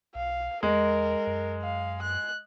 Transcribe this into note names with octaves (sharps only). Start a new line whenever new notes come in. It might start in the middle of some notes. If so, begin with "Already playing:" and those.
B1 F5
E2 G#3 A#4
F#2
F5
F#6